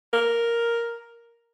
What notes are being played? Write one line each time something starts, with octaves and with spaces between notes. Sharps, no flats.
A#4